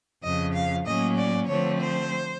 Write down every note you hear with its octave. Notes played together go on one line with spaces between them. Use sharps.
F2 C#3 F3 D#5
F5
A2 F#3 A#3 C#4 D#5
D5
D3 F3 A3 C4 C#5
C5